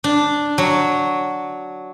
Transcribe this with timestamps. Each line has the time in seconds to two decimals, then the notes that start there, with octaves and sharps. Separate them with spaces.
0.04 D4
0.58 F#3